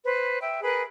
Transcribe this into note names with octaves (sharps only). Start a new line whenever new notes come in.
B4 C5
E5 G5
G#4 A#4 B4 B5